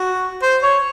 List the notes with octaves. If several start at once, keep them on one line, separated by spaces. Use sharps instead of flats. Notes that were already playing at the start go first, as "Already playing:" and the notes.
Already playing: F#4
C5
C#5